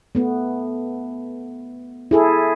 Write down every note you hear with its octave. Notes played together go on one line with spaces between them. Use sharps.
A3 B3
E4 G#4 A4